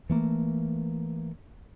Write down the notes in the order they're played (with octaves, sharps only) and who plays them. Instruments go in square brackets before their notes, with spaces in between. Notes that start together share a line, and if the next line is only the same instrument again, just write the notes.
[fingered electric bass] E3 A3 A#3